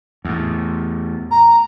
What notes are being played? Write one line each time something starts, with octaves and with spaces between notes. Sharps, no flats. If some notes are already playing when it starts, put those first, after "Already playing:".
E2 A2
A#5